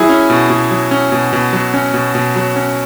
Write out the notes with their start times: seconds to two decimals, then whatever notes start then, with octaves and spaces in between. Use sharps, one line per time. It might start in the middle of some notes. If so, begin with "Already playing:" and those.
Already playing: F#3 E4 G#4
0.09 C#4
0.30 B2
0.50 B2
0.71 F#3
0.91 C#4
1.12 B2
1.33 B2
1.53 F#3
1.74 C#4
1.94 B2
2.15 B2
2.36 F#3
2.56 C#4